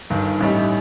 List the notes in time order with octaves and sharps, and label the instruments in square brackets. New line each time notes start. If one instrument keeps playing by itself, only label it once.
[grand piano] G1 G2 D#3
A1 A2 G3 D#4 G4